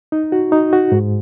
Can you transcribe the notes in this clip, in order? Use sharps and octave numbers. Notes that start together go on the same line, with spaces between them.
D#4
F#4
D#4
F#4
G#2